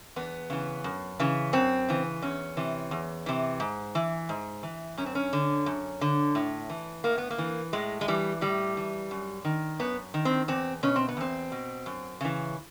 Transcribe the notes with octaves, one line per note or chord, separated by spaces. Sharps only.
E2 B3
C#3 E3
F#2
C#3 E3
F#2 C4
C#3 E3
E2 C#4
C3 E3
E2
C3 E3
G#2
E3
G#2
E3
F#2 C#4
C4
C#4
D3
F#2
D3
A2
E3
A2 A#3
B3
A#3
E3
A2 G#3
G#3
E3 G3
A2 G3
E3
F#2
D#3
F#2 B3
D#3
C4
E2 C4
B2 C#4
C4
B3
E2 C4
B2
F#2
C#3 E3